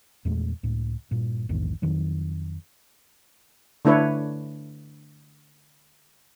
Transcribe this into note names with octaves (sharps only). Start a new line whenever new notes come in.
E2 A#2 G#3 A3
C#2 A2
G2 A#2
A#1 E2 G#2 D#3
F2 D#3 F#3
D3 A3 D4 E4 B4 C#5